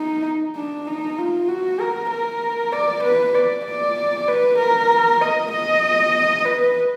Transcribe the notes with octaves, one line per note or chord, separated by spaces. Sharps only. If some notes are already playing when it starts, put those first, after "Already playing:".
Already playing: D#4
D4
D#4
F4
F#4
A#4
A#4
D5
B4
D5
D5
B4
A#4
D#5
D#5
B4